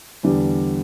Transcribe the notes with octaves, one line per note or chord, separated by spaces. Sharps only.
E2 D3 G3